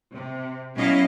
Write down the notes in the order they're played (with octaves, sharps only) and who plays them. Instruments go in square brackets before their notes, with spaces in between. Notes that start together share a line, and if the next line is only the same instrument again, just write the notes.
[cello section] C3
B2 F#3 C#4 E4 D#5 F5